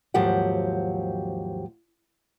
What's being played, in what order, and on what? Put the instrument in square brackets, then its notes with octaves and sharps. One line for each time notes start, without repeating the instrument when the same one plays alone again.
[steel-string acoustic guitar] D#2 G#2 F3 F#3 G4 F#5